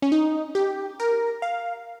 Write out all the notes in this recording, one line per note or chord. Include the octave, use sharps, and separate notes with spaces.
C#4
D#4
G4
A#4
F5